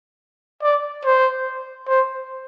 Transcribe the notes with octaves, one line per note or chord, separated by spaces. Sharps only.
D5
C5
C5